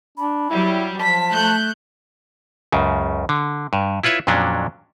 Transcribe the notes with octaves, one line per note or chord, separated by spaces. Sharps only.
D4 B5
F#3 G3 E4
F3 A5 B6
A3 F#6 G6
C#2 F#2 C#3
D3
G2
E4 F4 B4 C#5 E5
F2 A#2 F#3 C#4 D4